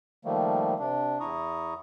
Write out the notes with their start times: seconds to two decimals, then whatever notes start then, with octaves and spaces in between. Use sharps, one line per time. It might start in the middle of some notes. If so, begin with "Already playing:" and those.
0.25 D#3 F3 G3 A3 A#3
0.79 C3 D4
1.20 E2 E4 A#5 C#6 D#6